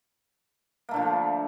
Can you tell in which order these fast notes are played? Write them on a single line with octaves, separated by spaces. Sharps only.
A#3 A3 D3 F3